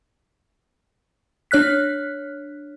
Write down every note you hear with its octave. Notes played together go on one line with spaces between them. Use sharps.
D4 C#5 F6 F#6 B6